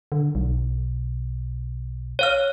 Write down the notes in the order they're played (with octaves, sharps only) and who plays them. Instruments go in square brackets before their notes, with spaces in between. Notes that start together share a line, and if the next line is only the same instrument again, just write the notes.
[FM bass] D3
B1
[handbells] C#5 F5 F6